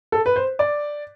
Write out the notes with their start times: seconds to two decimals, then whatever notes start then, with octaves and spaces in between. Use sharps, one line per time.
0.12 A4
0.26 B4
0.36 C5
0.59 D5